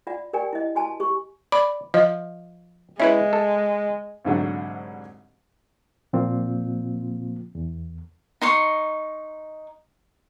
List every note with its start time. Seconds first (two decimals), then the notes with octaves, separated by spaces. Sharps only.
0.07 F4 D5 F#5
0.33 G4 A#4 D5 G5 G#5
0.53 E4 D#5
0.75 F#4 G#5 A5
1.00 G4 C#6
1.52 D5 B5
1.94 F3 D#5
3.00 G#3 C#4 E4 B4 E5
3.33 A4
4.25 C2 G#2 D3 F#3
6.13 A#2 F3 A#3 C4 F4
7.55 E2
8.42 D#4 C6 C#6